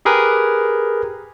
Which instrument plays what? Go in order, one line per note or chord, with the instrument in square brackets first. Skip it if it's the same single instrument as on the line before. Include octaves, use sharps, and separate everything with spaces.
[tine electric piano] G4 G#4 A#4 B4